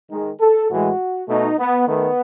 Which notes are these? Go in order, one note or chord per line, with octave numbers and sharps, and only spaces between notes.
D#3 G#3
A4
A2 E3 G#3 F#4
B2 A3 D#4
B3
D#3 A3 B3